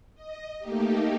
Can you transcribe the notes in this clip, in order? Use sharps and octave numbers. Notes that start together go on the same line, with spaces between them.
D#5
A3 A#3 D#4 G4